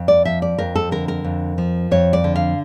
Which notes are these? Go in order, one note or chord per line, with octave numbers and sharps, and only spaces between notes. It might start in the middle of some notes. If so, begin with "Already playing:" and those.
Already playing: F2
D5
F3 E5
D5
F2 A#4
A4
D3 A#4
A#4
F2
F3
F2 C#5
D5
D3
F5